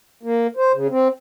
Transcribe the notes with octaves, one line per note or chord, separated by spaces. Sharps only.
A#3
C5
C#3
C4